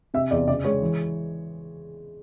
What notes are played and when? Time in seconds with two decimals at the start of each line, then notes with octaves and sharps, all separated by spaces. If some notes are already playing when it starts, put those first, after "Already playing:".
0.14 C3 E5
0.31 E2 D5
0.48 C#3 D5
0.64 G#3 C#5
0.82 E3